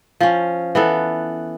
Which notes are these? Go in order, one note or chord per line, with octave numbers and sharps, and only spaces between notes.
F3 C#4
E3 B3 A4